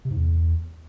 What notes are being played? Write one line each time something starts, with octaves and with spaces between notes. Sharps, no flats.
C3
G#2
E2